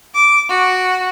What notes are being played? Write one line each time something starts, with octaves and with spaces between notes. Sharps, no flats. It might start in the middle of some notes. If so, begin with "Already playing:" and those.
D6
F#4